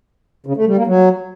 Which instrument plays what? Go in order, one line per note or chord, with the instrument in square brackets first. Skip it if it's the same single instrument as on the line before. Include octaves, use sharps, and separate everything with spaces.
[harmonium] C#3
A3
G3
A#3
F#3